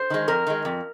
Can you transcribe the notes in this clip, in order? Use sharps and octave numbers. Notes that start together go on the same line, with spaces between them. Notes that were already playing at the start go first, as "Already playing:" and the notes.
Already playing: C5
D#3 G#3
F2 A#4
D#3 G#3
F2